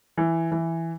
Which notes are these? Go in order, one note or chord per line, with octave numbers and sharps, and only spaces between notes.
E3
E3